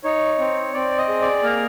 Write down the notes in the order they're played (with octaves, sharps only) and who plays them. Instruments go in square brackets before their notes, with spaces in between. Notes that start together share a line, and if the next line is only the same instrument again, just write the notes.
[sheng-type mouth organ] D#4 C#5
C4
C4 D5
D#5
G#4
D5
A#3 A#4